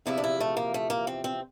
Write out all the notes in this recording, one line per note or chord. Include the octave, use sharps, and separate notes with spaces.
E2 C3 F3 E4
D4
E4
A3
A#3
A3
A#3
C4
C4